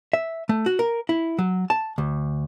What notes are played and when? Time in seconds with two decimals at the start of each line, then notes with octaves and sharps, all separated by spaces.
0.13 E5
0.49 A3
0.66 F#4
0.79 A#4
1.09 E4
1.39 F#3
1.70 A5
1.98 D2